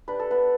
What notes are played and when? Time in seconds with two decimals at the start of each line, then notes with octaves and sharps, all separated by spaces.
0.08 G3 D4 B4
0.19 A4
0.30 B3 B4